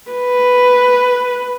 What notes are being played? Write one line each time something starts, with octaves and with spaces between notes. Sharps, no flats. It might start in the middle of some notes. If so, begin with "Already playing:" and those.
B4